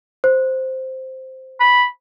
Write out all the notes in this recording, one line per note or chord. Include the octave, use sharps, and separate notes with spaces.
C5
B5